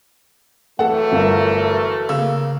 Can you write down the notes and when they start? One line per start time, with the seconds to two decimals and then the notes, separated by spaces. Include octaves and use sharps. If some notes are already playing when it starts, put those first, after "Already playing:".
0.79 E3 F#3 A3 A4 F#5
1.12 G1 A#4 F5
2.09 C#3 A#3 E6